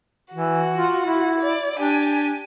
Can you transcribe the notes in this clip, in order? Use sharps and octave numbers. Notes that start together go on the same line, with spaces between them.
E3 F#4
F4
E4
D5
D4 G4 G#5